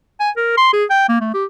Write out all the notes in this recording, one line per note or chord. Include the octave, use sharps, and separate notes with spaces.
G#5
A#4
C6
G#4
G5
A#3
A3
G4